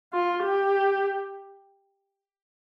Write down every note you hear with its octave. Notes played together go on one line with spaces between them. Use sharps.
F4
G4